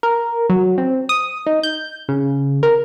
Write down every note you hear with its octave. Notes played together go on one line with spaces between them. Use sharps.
A#4
F#3
C4
D#6
D#4
G6
C#3
A#4